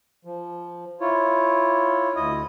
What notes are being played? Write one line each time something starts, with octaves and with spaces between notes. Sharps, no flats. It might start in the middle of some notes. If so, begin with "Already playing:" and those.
F3
E4 F4 C#5
D2 E4 D#5 D#6